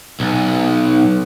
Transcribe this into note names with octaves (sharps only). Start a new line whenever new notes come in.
B1